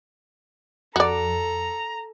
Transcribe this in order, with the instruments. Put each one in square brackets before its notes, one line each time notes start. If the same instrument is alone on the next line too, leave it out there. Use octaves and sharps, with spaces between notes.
[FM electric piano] F2 [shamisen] F#4 D5 [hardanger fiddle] A4 [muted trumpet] A#5